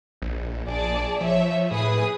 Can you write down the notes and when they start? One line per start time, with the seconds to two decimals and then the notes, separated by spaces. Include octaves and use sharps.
0.22 A#1
0.68 A#1 G#4 D5 A5
1.20 F3 C#5 E5
1.71 A2 G#4 B4 D#6